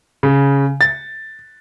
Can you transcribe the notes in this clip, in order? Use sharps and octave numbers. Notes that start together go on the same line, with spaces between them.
C#3
A6